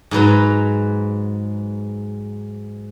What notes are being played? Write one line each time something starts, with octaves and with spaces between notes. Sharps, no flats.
G#2 F#3 B4 A#5